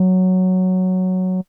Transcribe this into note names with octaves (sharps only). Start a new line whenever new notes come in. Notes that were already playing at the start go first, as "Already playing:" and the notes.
Already playing: F#3